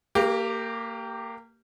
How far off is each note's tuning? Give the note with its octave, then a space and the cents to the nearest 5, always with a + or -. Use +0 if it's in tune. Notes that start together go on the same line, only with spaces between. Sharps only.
A#3 -25 G4 +0 A#4 +40